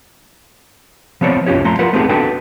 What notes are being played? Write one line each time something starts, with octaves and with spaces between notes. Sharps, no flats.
F3 B3 C4 C#5 D5
B1 F#2 C#4 F4 G4 C#5
F3 A3 A#5 C6
F4 A#4 B4 F#5
A3 B3 C4 D#4 G4 G#4
B3 D4 F#4 A4 B4 G5